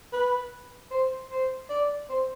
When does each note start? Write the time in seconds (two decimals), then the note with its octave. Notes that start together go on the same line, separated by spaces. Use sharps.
0.13 B4
0.91 C5
1.30 C5
1.70 D5
2.10 C5